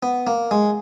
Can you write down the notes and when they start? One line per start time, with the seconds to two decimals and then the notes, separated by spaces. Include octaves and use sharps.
0.03 B3
0.27 A#3
0.51 G#3